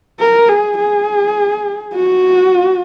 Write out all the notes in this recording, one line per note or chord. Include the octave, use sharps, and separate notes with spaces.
A#4
G#4
G#4
F#4